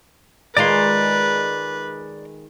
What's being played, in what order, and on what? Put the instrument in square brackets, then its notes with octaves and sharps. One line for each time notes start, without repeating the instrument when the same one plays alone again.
[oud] D#3 G#3 F4 [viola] B4 [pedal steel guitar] D5 A#5 C6